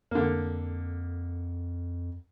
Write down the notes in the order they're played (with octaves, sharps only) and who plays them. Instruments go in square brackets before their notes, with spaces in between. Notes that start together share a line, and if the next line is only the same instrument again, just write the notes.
[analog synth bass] F2 [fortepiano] D3 A#3